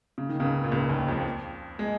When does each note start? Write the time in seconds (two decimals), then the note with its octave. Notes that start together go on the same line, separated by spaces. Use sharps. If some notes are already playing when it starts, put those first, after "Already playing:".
0.18 C#3
0.29 D#3
0.40 C#2 C#3
0.64 A#2
0.72 C#2 C#3
0.89 D#2 D#3
1.08 F2 F3
1.79 G#3